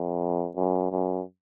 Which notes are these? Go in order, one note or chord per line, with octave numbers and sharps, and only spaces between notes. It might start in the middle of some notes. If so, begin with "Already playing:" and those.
Already playing: F2
F#2
F#2